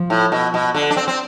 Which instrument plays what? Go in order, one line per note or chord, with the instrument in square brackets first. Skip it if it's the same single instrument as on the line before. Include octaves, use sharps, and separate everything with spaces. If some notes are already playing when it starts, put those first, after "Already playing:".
Already playing: [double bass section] F3
[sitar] A2
B2
B2
D3
D4
C4
C4